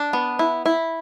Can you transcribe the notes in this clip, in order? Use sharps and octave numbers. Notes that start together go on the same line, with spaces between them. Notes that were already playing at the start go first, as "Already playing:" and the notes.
Already playing: D4
B3
E4
E4